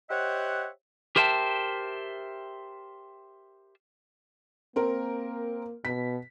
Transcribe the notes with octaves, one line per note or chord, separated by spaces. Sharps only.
G4 C5 C#5 D#5 E5 F#5
G4 A#4 C5 E5 G5 A5
A#3 C4 A#4
B2 B6